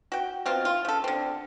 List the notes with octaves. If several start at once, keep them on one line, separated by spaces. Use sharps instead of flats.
F#4 G5
B2 C4 F4
F4
C#3 A4
D3 C4